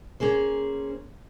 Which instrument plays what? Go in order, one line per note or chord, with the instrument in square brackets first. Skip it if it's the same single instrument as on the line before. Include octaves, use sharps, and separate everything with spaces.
[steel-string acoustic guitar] A#3 C#4 G#4 C5